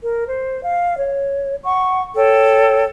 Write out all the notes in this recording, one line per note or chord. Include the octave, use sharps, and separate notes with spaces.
A#4
C5
F5
C#5
F#5 C#6
A4 C#5 G5